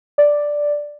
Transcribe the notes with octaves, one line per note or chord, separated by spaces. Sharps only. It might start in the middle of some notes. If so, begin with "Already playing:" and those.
D5